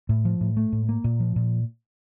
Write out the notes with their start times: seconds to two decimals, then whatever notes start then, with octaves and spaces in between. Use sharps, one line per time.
0.09 A2
0.25 F3
0.41 A2
0.57 A3
0.72 A2
0.89 A#3
1.04 A#2
1.20 F3
1.36 A#2